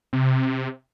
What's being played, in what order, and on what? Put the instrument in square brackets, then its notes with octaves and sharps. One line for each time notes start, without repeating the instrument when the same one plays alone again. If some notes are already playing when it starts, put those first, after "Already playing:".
[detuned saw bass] C3